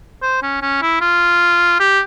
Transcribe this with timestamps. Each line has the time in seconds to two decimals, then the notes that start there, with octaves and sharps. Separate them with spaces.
0.22 C5
0.42 C#4
0.62 C#4
0.82 E4
1.01 F4
1.80 G4